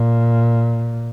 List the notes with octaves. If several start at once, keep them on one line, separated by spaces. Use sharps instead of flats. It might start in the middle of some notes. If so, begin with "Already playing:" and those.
Already playing: A#2